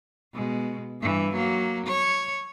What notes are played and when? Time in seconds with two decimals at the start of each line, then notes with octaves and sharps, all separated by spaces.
0.33 B2 G#3
1.01 G2 E3
1.32 F#3 A#3
1.86 C#5